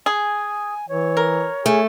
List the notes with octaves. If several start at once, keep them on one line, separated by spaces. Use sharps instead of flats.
G#4 G#5
E3 C#5
A#4
A3 G#4